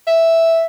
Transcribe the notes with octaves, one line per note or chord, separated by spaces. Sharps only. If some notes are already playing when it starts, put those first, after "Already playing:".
E5